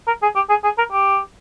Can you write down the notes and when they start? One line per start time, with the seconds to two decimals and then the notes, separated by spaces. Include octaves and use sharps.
0.07 A#4
0.22 G#4
0.36 G4
0.50 G#4
0.64 G#4
0.78 A#4
0.92 G4